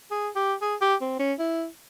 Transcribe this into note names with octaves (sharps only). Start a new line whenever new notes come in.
G#4
G4
G#4
G4
C4
C#4
E4